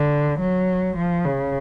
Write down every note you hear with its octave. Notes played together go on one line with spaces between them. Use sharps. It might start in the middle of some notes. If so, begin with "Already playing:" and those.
Already playing: D3
F#3
F3
C#3